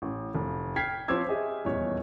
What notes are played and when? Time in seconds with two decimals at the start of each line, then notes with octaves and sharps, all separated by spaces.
0.02 A1
0.34 F1
0.76 G5 F6 G#6 B6 C7
1.08 F3 C4 C#5 D6 E6 G#6
1.28 G4 G#4 D#5 E5
1.65 D#1 E2 D#4 C#5